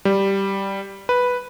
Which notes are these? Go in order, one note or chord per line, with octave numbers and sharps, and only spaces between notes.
G3
B4